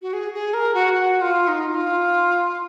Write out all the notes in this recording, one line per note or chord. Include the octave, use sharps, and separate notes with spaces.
F#4
G#4
G#4
A#4
F#4
F#4
F4
D#4
D#4
F4